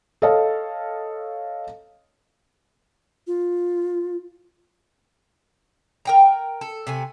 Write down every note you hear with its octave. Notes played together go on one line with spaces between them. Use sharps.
A4 C#5 D#5 F5 A5
F4
A#4 G5 A#5
A4
C3 A3 G#5